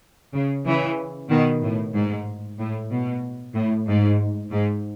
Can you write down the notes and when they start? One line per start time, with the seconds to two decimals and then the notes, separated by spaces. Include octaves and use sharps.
0.34 C#3
0.66 C#3 E3
1.30 B2 D#3
1.62 A2
1.94 G#2
2.58 A2
2.90 B2
3.55 A2
3.87 G#2
4.51 G#2